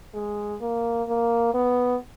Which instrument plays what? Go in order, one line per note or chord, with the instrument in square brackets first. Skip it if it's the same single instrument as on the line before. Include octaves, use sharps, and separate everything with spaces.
[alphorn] G#3
A#3
A#3
B3